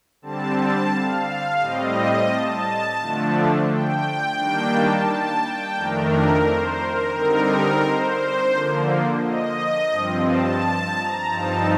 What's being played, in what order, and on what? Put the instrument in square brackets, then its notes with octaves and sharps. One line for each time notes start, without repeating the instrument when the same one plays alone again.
[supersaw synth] D3 G3 C4 A5
A5
F5
A2 G3 C4 D#5
A5
D3 F3 A3 D4
G5
D#3 G3 A#3 D4
A5
A5
G5
F2 D#3 A3 D4 A#4
C5
A#4
D3 G3 C4 D#4 A#4
C5
D3 F3 A#3
D#5
G2 F3 C4
A5
A#5
G2 F3 C4 D#4 A5